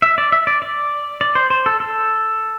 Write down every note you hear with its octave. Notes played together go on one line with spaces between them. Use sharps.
E5
D5
E5
D5
D5
D5
C5
C5
A4
A4